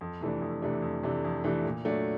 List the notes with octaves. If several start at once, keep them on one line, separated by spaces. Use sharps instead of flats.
F2
C3 E3 A3 D4
F2
C3 E3 A3 D4
F2
C3 E3 A3 D4
F2
C3 E3 A3 D4
A#2
F#3 A3 D4